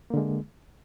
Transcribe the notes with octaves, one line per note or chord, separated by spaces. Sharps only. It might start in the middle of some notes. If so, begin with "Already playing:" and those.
D3 G#3 A#3